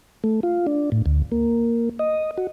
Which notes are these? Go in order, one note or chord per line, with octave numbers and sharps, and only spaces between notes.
A3
F4
D4
A2
D2
A#3
D#5
F#4